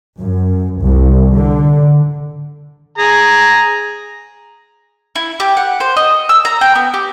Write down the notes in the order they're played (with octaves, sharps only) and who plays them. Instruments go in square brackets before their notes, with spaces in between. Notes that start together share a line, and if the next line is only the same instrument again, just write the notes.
[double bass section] F#2
C2
D3
[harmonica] G#4 A#5
[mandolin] E4
G4
F#5
C5
D#5
E6
A#5
G5
B3
G4